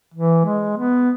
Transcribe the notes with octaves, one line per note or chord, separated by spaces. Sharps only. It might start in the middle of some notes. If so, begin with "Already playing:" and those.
E3
G#3
B3